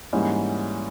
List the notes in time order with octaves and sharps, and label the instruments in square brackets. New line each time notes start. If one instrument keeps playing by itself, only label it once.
[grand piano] G#2 E3 G3 A#3 C#4